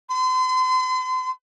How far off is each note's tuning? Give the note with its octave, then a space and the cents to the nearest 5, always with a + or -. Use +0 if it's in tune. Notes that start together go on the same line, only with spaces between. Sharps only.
C6 -40